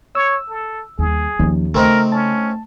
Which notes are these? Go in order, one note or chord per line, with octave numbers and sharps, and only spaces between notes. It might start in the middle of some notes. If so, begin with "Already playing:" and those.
C#5 E6
A4
D#2 G3 G#4
D#2 F3 C#4
C#3 A3 C4 D#4 A#4
C#4 A5